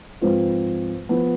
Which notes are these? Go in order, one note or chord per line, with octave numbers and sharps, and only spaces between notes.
G#2 F3 C4 F4 B4
F3 B3